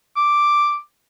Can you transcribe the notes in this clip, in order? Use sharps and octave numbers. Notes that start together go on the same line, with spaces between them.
D6